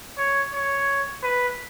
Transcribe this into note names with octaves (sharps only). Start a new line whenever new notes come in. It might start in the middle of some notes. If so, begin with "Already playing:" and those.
C#5
C#5
B4